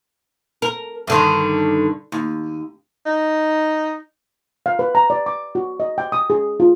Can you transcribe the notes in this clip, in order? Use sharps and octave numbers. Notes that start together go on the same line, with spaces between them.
A#4
G2 D3 D#3
D#2
D#4
F5
B4
A#5
D5
D6
F#4
D#5
G5
D#6
G#4
F4